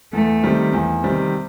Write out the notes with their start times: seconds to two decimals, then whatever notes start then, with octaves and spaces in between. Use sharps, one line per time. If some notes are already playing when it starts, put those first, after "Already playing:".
0.13 E2 A3
0.43 C3 D#3 G3 C4
0.73 E2
1.03 C3 D#3 G3 C4